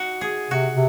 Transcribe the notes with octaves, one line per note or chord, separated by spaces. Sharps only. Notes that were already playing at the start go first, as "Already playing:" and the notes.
Already playing: D#4 F#4
G#4
C3 F#4
C3